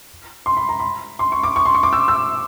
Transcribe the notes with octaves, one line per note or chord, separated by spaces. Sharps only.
C6
B5
A#5
B5
C6
C#6
D6
C#6
C6
C#6
D6
E6
E6